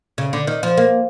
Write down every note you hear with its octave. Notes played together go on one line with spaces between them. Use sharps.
C#3
D3
D#3
F3
A#3